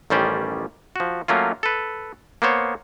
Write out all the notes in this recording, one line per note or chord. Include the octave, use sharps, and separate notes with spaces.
A1 D#3 G3 C#4 C5 D5
F3 F#4
F#3 A3 A#3 C#4 F4
A4 B4
A#3 B3 C5 C#5